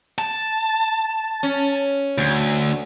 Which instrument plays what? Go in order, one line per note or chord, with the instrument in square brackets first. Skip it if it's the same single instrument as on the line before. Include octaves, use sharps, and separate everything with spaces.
[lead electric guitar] A5
[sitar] C#4
[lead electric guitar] D2